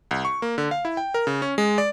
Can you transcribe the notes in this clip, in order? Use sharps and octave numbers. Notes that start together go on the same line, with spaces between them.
C2
C#6
A#3
D3
F5
E4
G5
A#4
C#3
C#4
G#3
D5